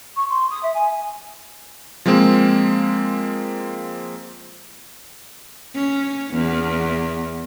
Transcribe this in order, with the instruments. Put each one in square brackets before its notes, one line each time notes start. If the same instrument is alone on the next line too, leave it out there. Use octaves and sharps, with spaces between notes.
[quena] C#6
C6
D#6
E5
G#5
[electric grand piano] F3 G#3 A#3 C4
[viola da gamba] C#4
E2